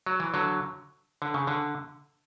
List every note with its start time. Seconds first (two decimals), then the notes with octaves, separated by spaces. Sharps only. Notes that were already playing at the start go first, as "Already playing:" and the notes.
0.06 F#3
0.20 E3
0.34 D3 F#3
1.22 D3
1.34 C#3
1.47 D3